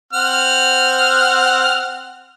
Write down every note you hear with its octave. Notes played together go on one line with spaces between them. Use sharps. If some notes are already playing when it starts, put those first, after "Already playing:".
C4 F#5 F6